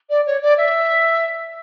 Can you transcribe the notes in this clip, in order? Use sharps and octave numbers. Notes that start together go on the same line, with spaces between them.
D5
C#5
D5
E5